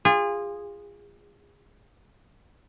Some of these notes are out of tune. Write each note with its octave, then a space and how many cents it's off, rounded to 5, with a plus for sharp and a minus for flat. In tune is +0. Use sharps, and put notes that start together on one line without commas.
F4 +0 G#4 -30